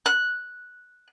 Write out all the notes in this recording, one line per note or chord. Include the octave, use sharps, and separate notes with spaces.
F#6